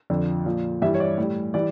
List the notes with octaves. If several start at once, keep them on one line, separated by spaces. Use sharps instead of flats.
F2 D3 F3
A#2 F3
G2 E3 G3 E5
C#5
D5
A2 G3
E3 G3 D5